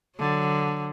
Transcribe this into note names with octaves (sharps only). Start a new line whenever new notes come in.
D3 F#3